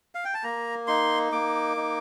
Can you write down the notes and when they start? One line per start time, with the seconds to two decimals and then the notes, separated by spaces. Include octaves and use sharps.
0.15 F5
0.25 G5
0.34 A5
0.43 A#3 A#5
0.87 D#4 C6
1.32 A#3 D6
1.77 D#4